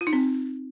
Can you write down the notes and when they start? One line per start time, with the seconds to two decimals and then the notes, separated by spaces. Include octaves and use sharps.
0.01 F4
0.07 D#4
0.13 C4